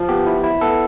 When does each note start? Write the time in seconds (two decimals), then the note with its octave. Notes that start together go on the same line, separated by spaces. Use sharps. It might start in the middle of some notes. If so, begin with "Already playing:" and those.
Already playing: F3
0.09 B3 G4
0.26 E4
0.44 E4
0.61 B3 A4